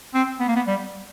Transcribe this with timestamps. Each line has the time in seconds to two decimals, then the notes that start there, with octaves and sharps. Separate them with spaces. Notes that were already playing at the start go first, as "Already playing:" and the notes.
0.14 C4
0.40 B3
0.48 A#3
0.56 B3
0.67 G3